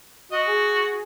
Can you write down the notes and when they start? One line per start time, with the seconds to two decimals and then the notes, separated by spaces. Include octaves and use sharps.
0.32 F#4 D#5
0.47 G#4